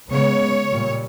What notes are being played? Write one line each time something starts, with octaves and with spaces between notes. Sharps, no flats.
C#3 G#3 B3 C#5
A#2 G3